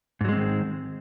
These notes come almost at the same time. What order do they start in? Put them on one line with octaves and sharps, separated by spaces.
G#2 F#3 G#3 C4 D#3